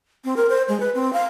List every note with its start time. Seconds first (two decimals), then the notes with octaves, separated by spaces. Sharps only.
0.25 C4
0.37 A#4
0.49 C5
0.68 G#3
0.80 B4
0.95 C4
1.13 F5